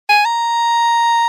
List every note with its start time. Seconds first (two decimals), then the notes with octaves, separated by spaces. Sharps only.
0.09 G#5
0.25 A#5